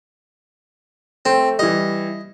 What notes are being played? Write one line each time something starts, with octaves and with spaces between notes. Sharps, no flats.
A3 C4
E3 G3 D#5